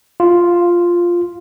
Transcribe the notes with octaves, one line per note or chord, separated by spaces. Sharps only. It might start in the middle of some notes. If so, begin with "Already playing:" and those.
F4